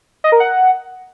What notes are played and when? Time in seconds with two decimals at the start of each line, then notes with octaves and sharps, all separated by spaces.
0.24 D#5
0.32 A#4
0.40 F#5